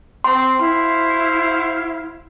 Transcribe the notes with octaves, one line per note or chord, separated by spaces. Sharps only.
C4 C6
E4 F#4 C5 F5 C6